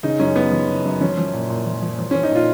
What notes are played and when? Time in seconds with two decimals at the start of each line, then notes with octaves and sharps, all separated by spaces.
0.03 C#3 D#4
0.20 F#2 C#4
0.36 F#2 B3
0.52 F3
0.69 C#3
0.85 F#2
1.01 F3 C#4
1.18 F3
1.34 A#2
1.50 A#2
1.66 F3
1.82 F3
1.98 F3
2.11 C#4
2.15 F3
2.23 D#4
2.31 A#2 F4